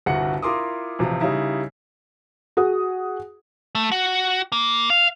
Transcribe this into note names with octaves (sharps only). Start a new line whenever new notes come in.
G1 C2 F#4 F#5 C#7
E4 F4 A#4 C6 D6 D#6
A1 C3 F3
C#3 G3 D#4 E4
F#4 G#4 F#5 D#6
A3
F#4
A#3
F5